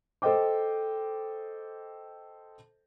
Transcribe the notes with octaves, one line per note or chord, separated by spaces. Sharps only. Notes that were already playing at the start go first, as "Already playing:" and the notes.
A4 C5 D#5 G5 D6